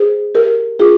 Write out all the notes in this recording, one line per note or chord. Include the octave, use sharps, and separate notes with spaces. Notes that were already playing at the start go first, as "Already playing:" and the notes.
Already playing: G#4 C5
G4 A#4
F4 G#4